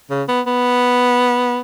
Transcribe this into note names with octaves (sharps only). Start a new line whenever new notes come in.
C#3
B3
B3